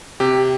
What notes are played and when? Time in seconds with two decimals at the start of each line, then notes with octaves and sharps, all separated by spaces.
0.20 C3 G4